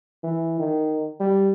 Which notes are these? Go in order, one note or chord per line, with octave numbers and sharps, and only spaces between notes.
E3
D#3
G3